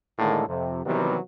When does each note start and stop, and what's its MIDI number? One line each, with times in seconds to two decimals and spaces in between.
0.19 0.44 45
0.19 0.44 50
0.19 0.44 51
0.19 0.44 56
0.19 0.44 58
0.19 0.44 69
0.47 0.83 41
0.47 0.83 48
0.85 1.17 48
0.85 1.17 51
0.85 1.17 52
0.85 1.17 54
0.85 1.17 55
0.85 1.17 59